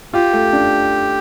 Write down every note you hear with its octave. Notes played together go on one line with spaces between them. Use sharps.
F4 G4
A3
D4